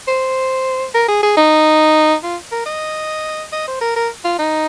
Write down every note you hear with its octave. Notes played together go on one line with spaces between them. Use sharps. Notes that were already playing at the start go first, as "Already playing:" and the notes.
C5
A#4
G#4
G#4
D#4
F4
A#4
D#5
D#5
C5
A#4
A#4
F4
D#4